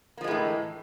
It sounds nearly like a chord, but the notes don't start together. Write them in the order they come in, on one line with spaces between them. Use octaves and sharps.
A#3 F3 G#3 A2 E3